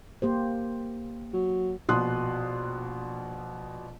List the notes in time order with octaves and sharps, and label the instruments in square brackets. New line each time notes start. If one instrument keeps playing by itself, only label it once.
[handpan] A#3 G4 C5
[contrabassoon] F#3
[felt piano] A#1 B2 C6 D#6 F#6